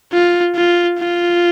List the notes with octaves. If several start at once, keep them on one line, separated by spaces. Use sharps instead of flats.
F4
F4
F4